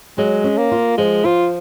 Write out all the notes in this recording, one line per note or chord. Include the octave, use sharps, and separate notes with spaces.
F#3 G#3
C#4
A#3
F4
F3 G#3
F3 F4